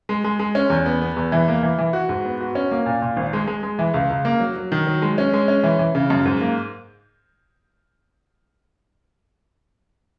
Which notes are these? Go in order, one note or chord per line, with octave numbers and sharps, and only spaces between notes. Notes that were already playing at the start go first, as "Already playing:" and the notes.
G#3
G#3
G#3
C#4
E2
B3
B3
E2
E3
A#3
E3
E3
F#4
G#2
B3
F#4
C#4
A#3
A#2
A#2
G#1
G#3
G#3
G#3
E3
C#2
C#2
A#3
F#3
F#3
D#3
F#3
G#3
C#4
G#3
C#4
E3
E3
C#3
F#2
G#2
A#3